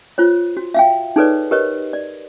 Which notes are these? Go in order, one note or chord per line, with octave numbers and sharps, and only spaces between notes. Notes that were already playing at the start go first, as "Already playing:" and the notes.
F4 C5 C#5
F#4
E5 F5 G5
D#4 G#4 A4 B4 C#5 D5
G4 A#4 B4 C#5 D#5
D5